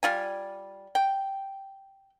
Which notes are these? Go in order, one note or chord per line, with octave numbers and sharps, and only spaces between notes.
G3 F4 G#5
G5